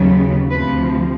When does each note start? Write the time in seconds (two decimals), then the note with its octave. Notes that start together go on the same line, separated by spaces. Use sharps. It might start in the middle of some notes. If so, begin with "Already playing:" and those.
Already playing: D#2 C#3 F#3 B3
0.50 D2 C3 F3 B4